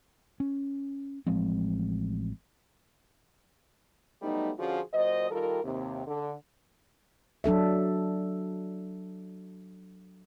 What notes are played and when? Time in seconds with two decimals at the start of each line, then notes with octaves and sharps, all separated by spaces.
0.40 C#4
1.27 A1 F3 G#3 C4
4.22 F#3 G3 A3 B3 D#4
4.58 D3 F3 C#4 F4 F#4 G#4
4.93 A#2 F#3 C5 D#5
5.30 D#3 G3 F4 A4 A#4
5.64 D#2 C3
6.06 D3
7.44 F#3 D4 A4 E5